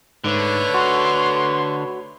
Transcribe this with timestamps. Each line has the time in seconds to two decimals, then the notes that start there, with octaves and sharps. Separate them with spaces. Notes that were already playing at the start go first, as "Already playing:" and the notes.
0.24 G#2 D3 A3 B4 C#5
0.74 F#4 C6